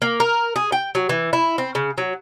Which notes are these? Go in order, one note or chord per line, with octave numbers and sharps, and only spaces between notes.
A#3
A#4
G#4
G5
F#3
E3
E4
C4
C#3
F#3